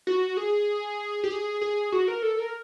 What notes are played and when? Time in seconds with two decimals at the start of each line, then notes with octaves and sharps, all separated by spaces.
0.07 F#4
0.37 G#4
1.24 G4
1.30 G#4
1.61 G#4
1.92 F#4
2.08 A#4
2.22 A4
2.39 A#4